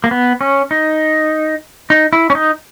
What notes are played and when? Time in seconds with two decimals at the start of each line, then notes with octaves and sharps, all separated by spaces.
0.04 A#3
0.11 B3
0.41 C#4
0.71 D#4
1.90 D#4
2.13 E4
2.30 C#4
2.35 D#4